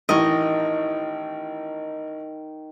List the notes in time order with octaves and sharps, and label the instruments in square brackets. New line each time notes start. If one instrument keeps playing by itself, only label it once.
[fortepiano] A1 E3 [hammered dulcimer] D#3 [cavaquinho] D#5 C#6